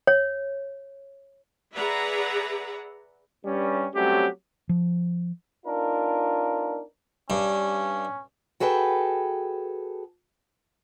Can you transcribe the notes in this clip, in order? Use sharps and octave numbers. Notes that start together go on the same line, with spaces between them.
C#5
G#4 B4 D5 E5 F#5 A#5
G2 G3 C#4
F#3 G3 A3 C4 C#4 G4
F3
B3 D4 D#4 F4 A#4
G2 C#4
F#4 G#4 A4 B4 G5